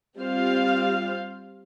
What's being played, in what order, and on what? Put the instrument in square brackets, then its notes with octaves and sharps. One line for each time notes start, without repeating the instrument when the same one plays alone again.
[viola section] G3 C4 F4 C5 F5